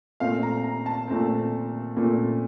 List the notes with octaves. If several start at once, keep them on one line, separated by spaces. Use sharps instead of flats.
A#2 A3 C4 F5
A#5
A#5
A5
A#2 A3 C4
A#2 A3 C4